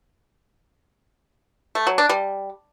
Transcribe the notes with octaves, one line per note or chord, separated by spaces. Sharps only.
A3
F#3
D4
G3